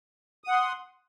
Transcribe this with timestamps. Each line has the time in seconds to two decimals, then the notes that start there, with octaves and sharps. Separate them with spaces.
0.44 D#6
0.48 F#5
0.52 C6